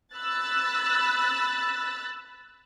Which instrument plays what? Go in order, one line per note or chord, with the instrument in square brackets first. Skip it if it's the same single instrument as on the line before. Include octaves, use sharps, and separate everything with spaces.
[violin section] B5 E6 F#6 A6